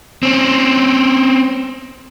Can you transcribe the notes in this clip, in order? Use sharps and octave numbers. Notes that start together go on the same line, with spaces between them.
C4 C#4